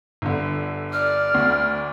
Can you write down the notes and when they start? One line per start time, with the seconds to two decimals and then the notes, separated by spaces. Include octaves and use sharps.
0.22 G1 D3
0.93 D5 F6
1.34 D2